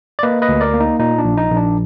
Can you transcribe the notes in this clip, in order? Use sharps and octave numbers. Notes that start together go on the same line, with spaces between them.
D5
A#3 B4 D#5
B4 D#5
D2
A#4 D5
A#3
D#4
A#2 D#4
D4
A#1
D#4
A#1
D4